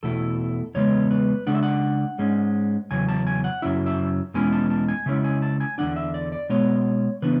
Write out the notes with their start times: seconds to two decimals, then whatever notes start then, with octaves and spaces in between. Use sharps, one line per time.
0.03 E2 B2 A3 E4 A4
0.74 E2 C#3 G#3 B3 C#5
1.11 B4
1.47 C#3 G#3 D4 F#5
1.55 E5
1.63 F#5
2.18 G#2 G#3 C#4
2.91 E2 C#3 F#3 G#5
3.09 A5
3.27 G#5
3.44 F#5
3.62 F#2 C#3 F#3 C#4 E4 E5
3.86 E5
4.34 E2 B2 G#3 C#4 E4 G#5
4.53 A5
4.70 A5
4.88 G#5
5.06 C#3 G#3 C#4 E4 E5
5.24 G#5
5.42 A5
5.60 G#5
5.78 E2 D3 G#3 D4 F#5
5.96 E5
6.14 D5
6.32 D5
6.49 B2 G#3 B3 C#5
7.22 C#3 E3 B3 D4 B4